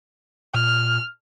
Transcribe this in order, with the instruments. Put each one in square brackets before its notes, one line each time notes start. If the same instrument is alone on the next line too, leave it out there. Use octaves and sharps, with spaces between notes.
[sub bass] A#2 [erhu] F6